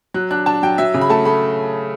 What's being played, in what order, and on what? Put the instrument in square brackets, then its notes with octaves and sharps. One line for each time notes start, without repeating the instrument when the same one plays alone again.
[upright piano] F#3 F#6
D4 F#6
D4 A5
F#3 G5
F#3 E5
C#3
B5
A3 A5
A3 B5